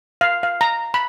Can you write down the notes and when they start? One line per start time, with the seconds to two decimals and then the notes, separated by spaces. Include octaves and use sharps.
0.21 F5
0.43 F5
0.61 A#5
0.94 B5